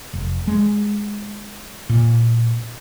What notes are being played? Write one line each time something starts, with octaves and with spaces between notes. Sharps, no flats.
F1
G#3
A#2